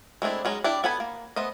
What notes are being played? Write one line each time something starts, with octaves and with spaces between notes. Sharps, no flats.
G#3 A3 C4 D4 E4
F#3 G#3 C#4 D#4
D4 E4 G4 D5 A5
B3 A4 F#5 G#5 B5
A#3
A3 B3 C5 D#5